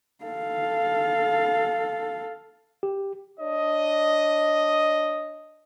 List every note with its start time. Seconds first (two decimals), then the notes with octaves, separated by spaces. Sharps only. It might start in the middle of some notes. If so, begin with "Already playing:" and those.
0.24 A4 F5
2.83 G4
3.40 D4 C#5 D#5